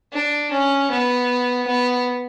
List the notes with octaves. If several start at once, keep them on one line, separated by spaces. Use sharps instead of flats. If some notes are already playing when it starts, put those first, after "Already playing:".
D4
C#4
B3
B3